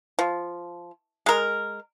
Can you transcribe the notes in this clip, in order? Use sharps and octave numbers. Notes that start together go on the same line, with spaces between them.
F3
G#3 A#4